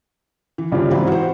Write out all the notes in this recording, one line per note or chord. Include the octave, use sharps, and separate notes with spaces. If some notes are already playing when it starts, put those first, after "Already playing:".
E3
A#1 G2 A#2 C#3 F3
G#2 E3 F#3 C4 E4 F4
F#4 C5